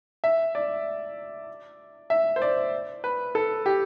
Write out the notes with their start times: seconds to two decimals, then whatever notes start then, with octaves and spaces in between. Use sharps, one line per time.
0.24 E5
0.55 D5
2.10 E5
2.36 C5
2.42 D5
3.04 B4
3.35 A4
3.66 G4